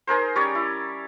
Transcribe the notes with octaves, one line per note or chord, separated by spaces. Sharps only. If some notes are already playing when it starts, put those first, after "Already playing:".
D#4 G#4 A#4 C5
G3 C#4 C#5 D5
E4